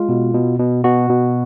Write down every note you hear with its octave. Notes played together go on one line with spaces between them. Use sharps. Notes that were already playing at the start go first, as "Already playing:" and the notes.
Already playing: G#3 F4
B2
B2
B2
B2 F#4
B2